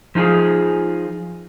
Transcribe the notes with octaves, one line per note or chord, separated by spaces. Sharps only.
F3 D#4 F4 G#4